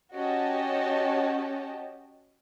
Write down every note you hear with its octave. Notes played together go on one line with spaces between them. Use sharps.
C#4 F#4 G4 D#5 A5